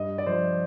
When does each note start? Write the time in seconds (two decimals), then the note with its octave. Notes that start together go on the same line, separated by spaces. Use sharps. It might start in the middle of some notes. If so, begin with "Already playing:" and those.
Already playing: G2 D#5
0.18 D5
0.26 F3 C5